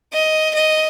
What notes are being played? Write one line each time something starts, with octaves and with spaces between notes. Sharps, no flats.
D#5
D#5